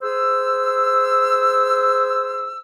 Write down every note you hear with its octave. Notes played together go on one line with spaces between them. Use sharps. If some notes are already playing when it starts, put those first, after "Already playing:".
G#4 C5 E6